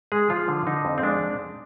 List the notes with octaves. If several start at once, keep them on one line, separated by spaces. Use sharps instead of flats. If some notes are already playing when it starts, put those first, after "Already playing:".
G#3 G#4
F3 F4
D3
D3 D#4
F2
C4
G#3 D4